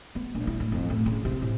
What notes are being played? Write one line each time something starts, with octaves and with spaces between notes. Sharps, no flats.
B3
A#1
E4
A2
F2
A2
C#3
C3
A2